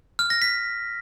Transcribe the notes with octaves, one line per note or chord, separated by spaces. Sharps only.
F6
A#6
B6